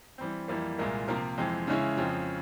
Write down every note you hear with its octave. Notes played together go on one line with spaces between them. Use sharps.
E3 G3 C4
F2 E3 G3 A#3
C2 A#2 G#3 E4 A#4
C3 F3 A#3 F4 A#4
F2 E3 G#3 C4
C#3 E3 G#3 C#4 E4
F2 C#3 F3 C4